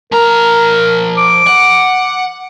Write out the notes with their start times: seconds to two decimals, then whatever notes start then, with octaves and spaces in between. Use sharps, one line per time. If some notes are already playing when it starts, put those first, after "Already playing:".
0.12 F3 A#4 A#5
1.17 D6
1.47 F#5